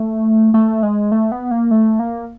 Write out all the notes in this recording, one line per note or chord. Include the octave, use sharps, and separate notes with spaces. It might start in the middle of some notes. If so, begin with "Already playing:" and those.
Already playing: A3
A3
G#3
A3
B3
A#3
A3
A#3